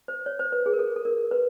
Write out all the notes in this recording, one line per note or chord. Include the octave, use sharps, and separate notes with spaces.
C5
C#5
C5
B4
G#4
A#4
A4
A4
A#4
B4